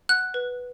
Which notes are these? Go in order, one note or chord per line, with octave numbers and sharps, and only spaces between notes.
F#5 F#6
B4